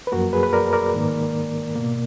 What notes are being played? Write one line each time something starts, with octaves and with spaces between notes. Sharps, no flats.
B4
F#2 F3 A#3 F#4 A#4
G#4 B4
B4
A#4 D5
A#4 D5
G#2 D#3 A#3
B2 A#3